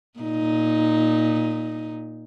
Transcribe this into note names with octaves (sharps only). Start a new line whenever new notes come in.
A#2 D#4